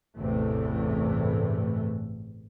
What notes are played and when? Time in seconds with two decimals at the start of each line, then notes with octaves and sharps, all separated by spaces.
0.17 A1 E2 G2 C3 E3 A3